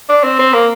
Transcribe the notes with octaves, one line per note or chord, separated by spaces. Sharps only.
D4
C4
C4
A#3